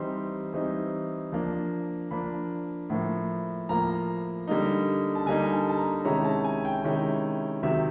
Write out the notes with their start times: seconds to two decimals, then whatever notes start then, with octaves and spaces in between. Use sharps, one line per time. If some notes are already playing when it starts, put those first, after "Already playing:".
Already playing: E3 G3 C4 D#4 C6
0.54 E3 G3 C4 D#4
1.32 F3 A#3 D4
2.11 F3 A#3 D4 B5
2.90 A2 F3 A#3
3.69 A2 F3 A#3 A#5
4.47 D3 G3 A#3 D#4
5.15 A5
5.26 D3 G3 A#3 D#4 G#5
5.52 A5
5.69 A5
5.78 A#5
6.05 C3 D#3 G#3 C#4 E4 A#5
6.24 A5
6.44 G#5
6.65 G5
6.84 C3 D#3 G#3 C#4 E4
7.63 C3 D#3 F#3 E5